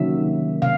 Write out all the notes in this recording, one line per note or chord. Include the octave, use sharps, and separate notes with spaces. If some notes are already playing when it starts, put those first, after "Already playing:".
Already playing: C3 D#3 F#3 A#3 C#4 E5
C3 F5